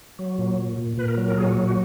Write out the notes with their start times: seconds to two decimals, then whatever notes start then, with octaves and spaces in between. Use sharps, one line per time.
0.19 F#3
0.38 A#2
0.58 A#2
0.78 A#2
0.98 A#2 B4
1.08 A#4
1.18 F#3
1.28 A#4
1.38 A#2 G#4
1.48 F#4
1.57 F#3
1.67 F#4